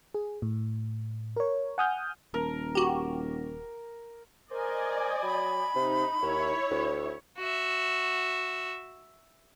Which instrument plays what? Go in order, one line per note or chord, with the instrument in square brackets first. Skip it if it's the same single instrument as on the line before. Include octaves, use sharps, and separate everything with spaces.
[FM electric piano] G#4
A2
A#4 C#5
F#5 G#5 D#6 F6 G6
[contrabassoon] D#1 [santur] A#4
[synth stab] F#4 G4
[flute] A#4 [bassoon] C5 [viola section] D5 D#5 G#5
[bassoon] F#3 [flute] B5
[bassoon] C3 [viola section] D#4
[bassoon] D#2 [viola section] E4 C#5
[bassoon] D2
[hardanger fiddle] F#4 E5